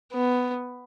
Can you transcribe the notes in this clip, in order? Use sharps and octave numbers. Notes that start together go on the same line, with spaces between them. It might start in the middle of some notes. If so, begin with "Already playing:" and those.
B3